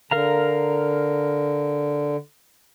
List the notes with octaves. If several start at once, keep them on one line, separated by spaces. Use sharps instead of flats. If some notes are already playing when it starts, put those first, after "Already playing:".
D3 A#4 F5 A#5